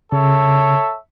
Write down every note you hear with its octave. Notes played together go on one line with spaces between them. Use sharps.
C#3 A4 C#5 E5